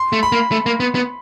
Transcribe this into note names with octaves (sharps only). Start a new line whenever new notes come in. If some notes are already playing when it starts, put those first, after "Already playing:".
Already playing: C6
A3
B5
A#3
A3
A#3
B3
B3